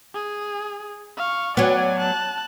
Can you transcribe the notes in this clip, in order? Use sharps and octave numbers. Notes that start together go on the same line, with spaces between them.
G#4
F5 C#6
F#3 B3 D5 G#5
A5 F#6